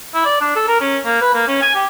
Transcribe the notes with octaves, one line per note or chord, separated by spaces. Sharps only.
E4
D5
D4
A4
A#4
C#4
A#3
B4
A#3
C#4
G#5
G4